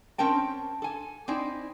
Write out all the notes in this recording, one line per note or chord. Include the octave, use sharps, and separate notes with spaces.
C4 C#4 A#4 G5 A5
A4 G#5
C4 D#4 E4 D5 G#5